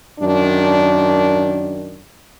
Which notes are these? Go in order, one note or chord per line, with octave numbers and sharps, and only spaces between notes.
F#2 D#3 D4